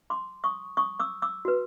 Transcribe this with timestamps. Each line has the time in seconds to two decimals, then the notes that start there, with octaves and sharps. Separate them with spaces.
0.10 C6 D6
0.44 C#6 D#6
0.77 C#6 D#6
1.00 D6 E6
1.22 D6 E6
1.45 F#4 B4